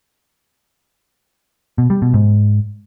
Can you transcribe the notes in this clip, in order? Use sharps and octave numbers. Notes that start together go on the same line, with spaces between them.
B2
G3
B2
G#2